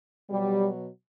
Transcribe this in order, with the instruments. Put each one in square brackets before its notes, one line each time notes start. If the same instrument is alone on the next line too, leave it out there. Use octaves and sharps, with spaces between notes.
[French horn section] B2 F#3 G3